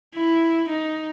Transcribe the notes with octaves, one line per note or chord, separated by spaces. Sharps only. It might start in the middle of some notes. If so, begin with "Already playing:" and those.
E4
D#4